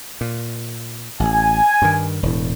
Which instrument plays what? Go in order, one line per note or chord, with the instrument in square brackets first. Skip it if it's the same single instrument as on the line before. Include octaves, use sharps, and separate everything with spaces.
[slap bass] A#2
[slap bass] A1 [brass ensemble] G#5
[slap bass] G2 D#3
E1 A2